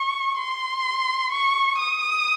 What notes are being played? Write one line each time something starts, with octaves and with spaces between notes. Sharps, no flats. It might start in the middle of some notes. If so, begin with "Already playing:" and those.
Already playing: C#6
C6
C#6
D#6